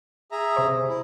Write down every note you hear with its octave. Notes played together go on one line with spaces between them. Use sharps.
G#4 E5 A#5
C3 C5
E4